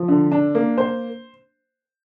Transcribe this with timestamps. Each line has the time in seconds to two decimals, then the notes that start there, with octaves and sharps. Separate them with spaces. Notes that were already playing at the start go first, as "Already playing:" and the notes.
Already playing: F3
0.08 D3
0.32 D4
0.55 A#3
0.78 C5